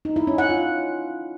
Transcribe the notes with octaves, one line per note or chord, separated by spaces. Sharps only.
D#4
E4
C#4
F#5
F4